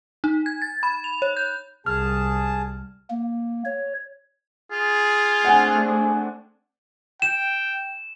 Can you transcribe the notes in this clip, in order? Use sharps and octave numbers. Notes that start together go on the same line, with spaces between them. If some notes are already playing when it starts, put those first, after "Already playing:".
D#4
G#6
A6
B5
F7
C#5
G6
C2 G3 G#4 A5 F6
A#3
C#5
F4 G#4
A3 C4 D4 F#5 G#5
G5 E7